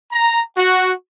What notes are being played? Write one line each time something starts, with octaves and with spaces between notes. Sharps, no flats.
A#5
F#4